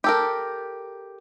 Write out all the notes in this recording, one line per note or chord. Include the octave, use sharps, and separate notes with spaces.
G4 A4 A#4